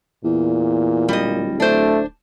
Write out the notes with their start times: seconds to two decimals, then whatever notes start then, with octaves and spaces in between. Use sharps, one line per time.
0.24 E2 A#2
1.09 D1 G3 D#5
1.60 A3 D4 C5